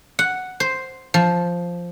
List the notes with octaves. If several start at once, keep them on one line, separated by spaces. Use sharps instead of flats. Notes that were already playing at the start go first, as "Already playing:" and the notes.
F#5
C5
F3